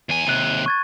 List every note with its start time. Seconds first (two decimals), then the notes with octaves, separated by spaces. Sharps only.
0.09 E2 G#5
0.27 D#2 C3 F#6 D#7
0.66 C#6 G#6 A6